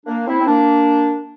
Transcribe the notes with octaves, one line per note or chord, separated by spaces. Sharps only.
A#3 D4
C4 E4
C4
A#3 D4